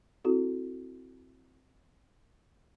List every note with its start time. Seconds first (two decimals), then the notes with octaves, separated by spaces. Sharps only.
0.24 C4 E4 F#4 A4